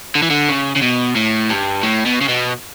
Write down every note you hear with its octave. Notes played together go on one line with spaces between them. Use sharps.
D3
E3
D3
C#3
C#3
B2
A2
G2
A2
B2
C#3
B2